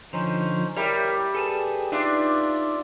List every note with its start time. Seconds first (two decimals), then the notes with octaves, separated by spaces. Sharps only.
0.13 D3 F3 C#4 D#4 C5
0.76 G3 E4 A#4 C#5 E5
1.35 G#4 A4 B4 A5
1.92 D4 D#4 F4 B4 D5 E5